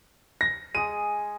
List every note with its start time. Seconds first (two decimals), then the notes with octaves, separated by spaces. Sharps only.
0.41 A#6
0.75 G#3 G#4 D#7